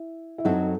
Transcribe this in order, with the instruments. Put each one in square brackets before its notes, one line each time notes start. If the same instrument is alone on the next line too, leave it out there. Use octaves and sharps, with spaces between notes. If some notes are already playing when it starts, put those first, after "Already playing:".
Already playing: [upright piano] E4
E4
[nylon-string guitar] F#2 F#3 C4 F#4 A4 [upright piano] D#4